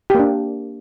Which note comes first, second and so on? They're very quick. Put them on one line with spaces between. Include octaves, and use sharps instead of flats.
G4 A#3 D4